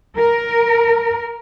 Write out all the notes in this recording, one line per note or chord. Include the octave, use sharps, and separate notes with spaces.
A#4